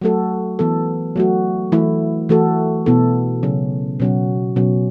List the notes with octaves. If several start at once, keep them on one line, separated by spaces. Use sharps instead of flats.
F#3 A3 F#4 A4
E3 B3 A4
F#3 A3 F#4
E3 A3 E4
E3 A3 F#4 A4
B2 B3 E4 A4
C#3 F#3 C#4
B2 F#3 C#4 F#4
B2 F#3 C#4